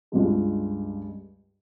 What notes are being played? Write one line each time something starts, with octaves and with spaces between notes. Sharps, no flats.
C#2 G2 G#3